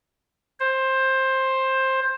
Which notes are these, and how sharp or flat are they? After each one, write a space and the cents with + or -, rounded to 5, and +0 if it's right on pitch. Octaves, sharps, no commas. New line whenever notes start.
C5 +15